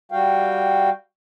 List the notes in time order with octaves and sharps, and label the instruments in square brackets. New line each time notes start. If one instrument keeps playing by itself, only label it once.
[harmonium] G3 F#4 F5 G5